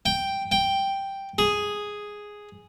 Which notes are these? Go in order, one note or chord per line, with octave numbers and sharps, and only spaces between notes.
G5
G5
G#4